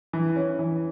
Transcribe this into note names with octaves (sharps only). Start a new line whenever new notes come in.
E3
C#4
E3